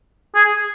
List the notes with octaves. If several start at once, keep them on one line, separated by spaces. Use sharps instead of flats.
G#4